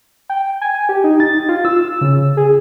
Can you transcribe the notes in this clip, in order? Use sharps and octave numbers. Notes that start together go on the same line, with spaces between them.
G5
G#5
G4
D#4
A6
F4
E6
C#3
G#4